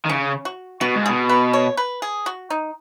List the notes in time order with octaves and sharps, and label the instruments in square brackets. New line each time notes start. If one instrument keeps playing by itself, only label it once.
[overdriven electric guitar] D#3
[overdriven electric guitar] C#3 [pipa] C#4
[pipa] F#4
[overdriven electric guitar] B2 [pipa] F#4
[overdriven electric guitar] G#2
[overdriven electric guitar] B2 [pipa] G#4
[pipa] B4
C#5
B4
G#4
F#4
D#4